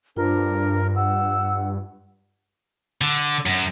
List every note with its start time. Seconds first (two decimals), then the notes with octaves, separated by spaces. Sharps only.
0.17 G2 D4 F4 A#4 C5
0.96 F#5 E6
3.01 D3
3.46 F#2